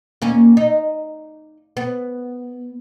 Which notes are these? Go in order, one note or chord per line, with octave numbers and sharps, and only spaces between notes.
D#2 A#3 C#4
D#4
B3